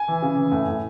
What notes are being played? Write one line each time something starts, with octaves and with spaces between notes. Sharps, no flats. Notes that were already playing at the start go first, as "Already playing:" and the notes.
Already playing: G#5
E3
C#3
E3
A2
A2